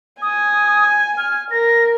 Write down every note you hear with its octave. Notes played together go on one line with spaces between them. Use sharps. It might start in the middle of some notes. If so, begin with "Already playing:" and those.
G#5 D#6
G#5 F6
A#4 A#6